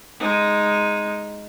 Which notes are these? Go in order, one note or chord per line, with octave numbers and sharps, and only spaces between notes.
G#3 D#4